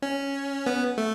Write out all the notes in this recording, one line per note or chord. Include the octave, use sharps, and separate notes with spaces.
C#4
B3
A3